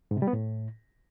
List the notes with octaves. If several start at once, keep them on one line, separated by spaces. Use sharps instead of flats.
G#2
C3
G3
B3
A2